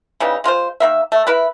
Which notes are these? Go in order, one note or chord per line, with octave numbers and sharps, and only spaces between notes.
C#3 E3 G3 D#4
G#3 F4 A#4 C5
D#3 A#3 E5
A3
E4 A#4 B4